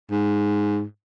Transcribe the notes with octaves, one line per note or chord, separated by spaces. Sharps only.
G#2